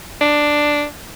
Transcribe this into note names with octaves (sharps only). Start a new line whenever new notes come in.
D4